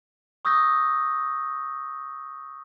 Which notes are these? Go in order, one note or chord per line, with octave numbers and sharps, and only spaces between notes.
C#6 D#6 E6 G6 A#6